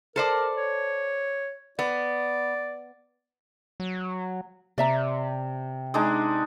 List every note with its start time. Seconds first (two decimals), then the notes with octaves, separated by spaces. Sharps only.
0.16 A4 A#4 C5 D5
0.57 C#5
1.79 B3 D5
3.80 F#3
4.78 C3 D5 E5 A#5
5.94 G#3 D4 D#4